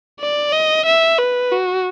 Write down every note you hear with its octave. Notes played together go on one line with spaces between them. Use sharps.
D5
D#5
E5
B4
F#4